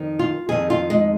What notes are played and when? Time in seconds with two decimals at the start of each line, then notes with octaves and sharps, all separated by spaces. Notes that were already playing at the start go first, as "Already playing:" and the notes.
Already playing: F2 D#3
0.19 F4
0.49 F2 D#3 G#4
0.70 F4
0.90 G#3